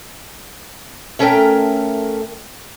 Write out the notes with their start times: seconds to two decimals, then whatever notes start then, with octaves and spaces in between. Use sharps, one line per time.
1.19 A3 C#4 A4 A#4 E5 G5